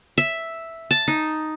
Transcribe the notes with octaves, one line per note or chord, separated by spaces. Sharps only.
E5
A5
D#4